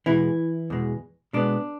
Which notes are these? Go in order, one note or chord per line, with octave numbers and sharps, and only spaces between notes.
E2 B2 E3 G#3 E4
E2 B2 G#3
B2 G#3 B3 D4